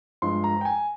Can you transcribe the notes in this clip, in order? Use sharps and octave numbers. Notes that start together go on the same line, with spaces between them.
G2 F3 G#3 C6
A#5
G5
G#5